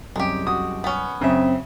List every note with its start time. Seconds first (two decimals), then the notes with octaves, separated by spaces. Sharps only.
0.16 C2 F#2 G#3 G4
0.46 F#4 D#6
0.84 B3 C#4
1.21 F#2 C#3 C4 C#5 E5 D#6